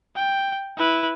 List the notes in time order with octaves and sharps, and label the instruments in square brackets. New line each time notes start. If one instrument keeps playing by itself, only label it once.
[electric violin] G5
E4 B4